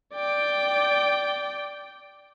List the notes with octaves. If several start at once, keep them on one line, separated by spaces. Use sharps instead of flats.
D5 G5